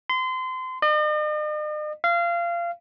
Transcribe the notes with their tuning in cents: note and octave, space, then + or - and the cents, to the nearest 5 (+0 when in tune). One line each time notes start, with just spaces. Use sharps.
C6 -30
D#5 -45
F5 -25